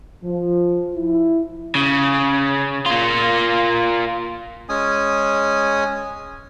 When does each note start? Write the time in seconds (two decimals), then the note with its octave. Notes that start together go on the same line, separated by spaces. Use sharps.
0.23 F3
0.95 E4
1.75 C#3
2.86 A#3 F4
4.69 G#3 C#4 G#5 D#6